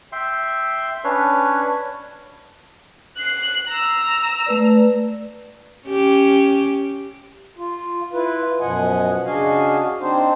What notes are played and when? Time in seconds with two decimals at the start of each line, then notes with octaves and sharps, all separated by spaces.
0.12 E5 G5 C6
1.04 C#4 D4 B4 C#5
3.17 F#6 C7
3.69 A#5 E6
4.46 A3 B4 D5
5.87 C#4 G4
7.57 F4
8.13 E4 F4 B4
8.60 F#2 B2 F3 D#5 F#5 G#5
9.25 C#3 D4 F#4 D#5 F5 G#5
10.00 C4 D4 D#4 C5